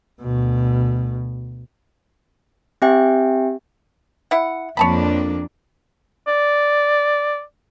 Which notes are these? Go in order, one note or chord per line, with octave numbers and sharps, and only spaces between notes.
D2 B2
C4 G4 E5 G5 G#5
E4 F#5
F2 A#3 D4 C#5 A5 B5
D5